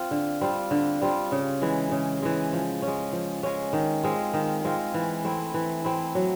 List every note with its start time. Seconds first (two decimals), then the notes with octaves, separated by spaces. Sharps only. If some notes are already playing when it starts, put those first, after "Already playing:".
Already playing: C4 F4
0.11 D3
0.41 G3 C4 F4
0.71 D3
1.02 G3 C4 F4
1.32 C#3
1.62 E3 G#3
1.92 C#3
2.22 E3 G#3
2.53 F3
2.82 C#4
2.87 G#3
3.13 F3
3.43 G#3 C#4
3.73 D#3
4.03 G#3 C4 F4
4.34 D#3
4.64 G#3 C4 F4
4.94 E3
5.24 A3 C4 E4
5.54 E3
5.84 A3 C4 E4
6.15 F#3